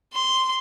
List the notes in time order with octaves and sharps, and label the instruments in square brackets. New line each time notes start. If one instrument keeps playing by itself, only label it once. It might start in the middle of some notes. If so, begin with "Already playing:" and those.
[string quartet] C6